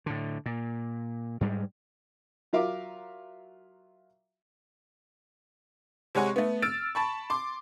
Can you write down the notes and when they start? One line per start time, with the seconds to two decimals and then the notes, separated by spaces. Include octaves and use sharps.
0.06 A2 D3
0.46 A#2
1.41 G#2 G3 G#3
2.53 F#3 F4 A#4 E5 F5 D6
6.15 C3 G#3 C#5 F#5 G#5 C#6
6.36 A3 B3
6.62 E6 F6 A6 D7
6.95 A5 B5 C#6
7.30 C6 D6